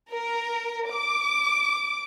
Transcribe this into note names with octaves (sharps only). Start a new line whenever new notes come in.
A#4
D6